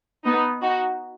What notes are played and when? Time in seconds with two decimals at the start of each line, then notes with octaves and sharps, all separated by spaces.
0.25 B3 D#4
0.62 D#4 F#4